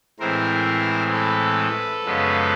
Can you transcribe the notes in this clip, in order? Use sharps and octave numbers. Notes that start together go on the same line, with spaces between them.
A2 E3 G#3 C4 A#4 C5
A4 B4
F#2 C#3 F3 G#3 B3